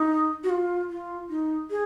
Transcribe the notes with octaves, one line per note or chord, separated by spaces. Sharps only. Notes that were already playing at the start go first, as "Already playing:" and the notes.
Already playing: D#4
F#4
F4
F4
D#4
G#4